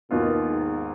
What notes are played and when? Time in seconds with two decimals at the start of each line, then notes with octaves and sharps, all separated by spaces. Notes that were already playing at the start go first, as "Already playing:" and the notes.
0.11 D#2 B2 D#3 B3 F4
0.46 G#2